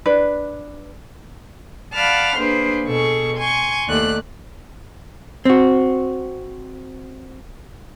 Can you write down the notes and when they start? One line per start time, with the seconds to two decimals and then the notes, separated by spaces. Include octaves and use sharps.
0.06 D4 B4
1.94 D5 F5 F#5 A5 B5 F6
2.38 A#3 D4 G#4 B4 C5
2.85 B2 G#4 A4 C#6
3.36 G#5 C6 C#6
3.88 D#2 A3 D5 F#6
5.45 C4 F#4